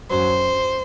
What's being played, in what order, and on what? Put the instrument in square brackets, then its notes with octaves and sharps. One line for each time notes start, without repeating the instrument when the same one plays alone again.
[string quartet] F#2 F#3 C5